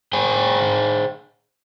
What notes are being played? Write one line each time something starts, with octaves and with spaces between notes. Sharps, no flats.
G#4 C5 G5 G#5